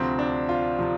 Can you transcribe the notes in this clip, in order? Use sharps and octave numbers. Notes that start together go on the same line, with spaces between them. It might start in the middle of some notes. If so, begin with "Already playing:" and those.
Already playing: D2 C3 F3 C4
D4
F4
C3 F3